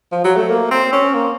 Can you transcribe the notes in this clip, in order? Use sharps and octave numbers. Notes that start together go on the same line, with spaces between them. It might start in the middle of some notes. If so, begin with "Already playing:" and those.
F3
F#3
A3
A#3
C4
C#4
A#3